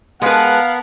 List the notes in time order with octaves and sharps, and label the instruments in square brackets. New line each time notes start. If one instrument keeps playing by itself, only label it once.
[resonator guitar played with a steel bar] G#3 B4 [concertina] B3 [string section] A#4 F#5 A5 [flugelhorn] F5